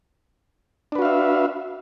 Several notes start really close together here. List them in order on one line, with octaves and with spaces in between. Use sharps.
D4 B4 F#4 F5 E5